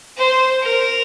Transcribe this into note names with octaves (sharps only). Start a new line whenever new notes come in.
C5
A#4